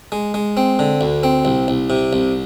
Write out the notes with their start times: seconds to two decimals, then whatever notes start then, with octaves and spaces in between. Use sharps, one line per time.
0.12 G#3
0.34 G#3
0.57 C4
0.79 D3
1.01 D2
1.23 C4
1.45 C2
1.68 C2
1.90 C3
2.13 C2